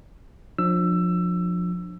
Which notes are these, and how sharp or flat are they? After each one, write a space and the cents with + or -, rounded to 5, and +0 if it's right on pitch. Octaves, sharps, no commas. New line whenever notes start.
F3 +25 D4 +15 E6 +20